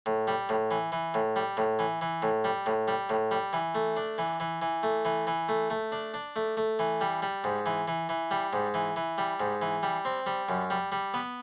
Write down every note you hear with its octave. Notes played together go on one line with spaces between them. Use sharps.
A2
G3
A2
E3
E3
A2
G3
A2
E3
E3
A2
G3
A2
G3
A2
G3
E3
A3
D4
E3
E3
E3
A3
E3
E3
A3
A3
D4
D4
A3
A3
E3
G3
G3
G#2
E3
E3
E3
G3
G#2
E3
E3
G3
G#2
E3
G3
C4
G3
F#2
G3
G3
B3